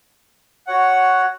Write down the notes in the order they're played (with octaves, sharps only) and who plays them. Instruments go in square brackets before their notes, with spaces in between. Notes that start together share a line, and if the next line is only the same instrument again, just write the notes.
[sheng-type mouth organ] F#4 C#5 F#5